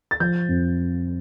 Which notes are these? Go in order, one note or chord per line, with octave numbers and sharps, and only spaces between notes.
A6
F3 G6
F2